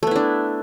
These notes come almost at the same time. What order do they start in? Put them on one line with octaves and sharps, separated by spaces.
A3 B3 E4 D4